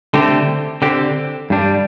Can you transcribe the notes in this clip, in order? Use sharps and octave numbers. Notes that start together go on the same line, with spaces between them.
D3 A3 C4 G4
D3 C4 G4
G2 G3 D4